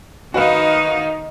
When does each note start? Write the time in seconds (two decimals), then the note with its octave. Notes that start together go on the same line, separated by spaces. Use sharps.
0.34 D#3 D#4 F#4 B4 F5